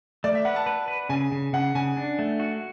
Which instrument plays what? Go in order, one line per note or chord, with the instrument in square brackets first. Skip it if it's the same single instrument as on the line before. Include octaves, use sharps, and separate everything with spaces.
[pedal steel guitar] A3 [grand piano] D5
[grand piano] E5
[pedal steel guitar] B4 [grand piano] F#5
[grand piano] A5
[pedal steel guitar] B4
B4
[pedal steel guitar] C#3 [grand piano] G#5
[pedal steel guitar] C#3
[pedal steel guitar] C#3 [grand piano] F#5
[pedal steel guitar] C#3 [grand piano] G#5
[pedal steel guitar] D4
A3
F#4